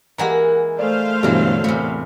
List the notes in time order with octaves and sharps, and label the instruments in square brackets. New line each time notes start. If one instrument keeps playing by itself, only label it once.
[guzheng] E3 G#3 A#3 [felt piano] G4 F#5 A#5
[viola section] A3 C5 F5 [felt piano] D5
[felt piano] G2 B2 E3 [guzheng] D3 F#3
[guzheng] E2 C3 [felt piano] A2